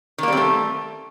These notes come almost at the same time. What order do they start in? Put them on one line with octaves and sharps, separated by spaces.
D#3 A#3 G3 C4 A3